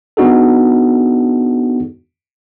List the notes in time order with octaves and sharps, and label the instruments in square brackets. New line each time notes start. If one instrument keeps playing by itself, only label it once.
[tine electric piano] B3 D4 D#4 F#4 G#4 A4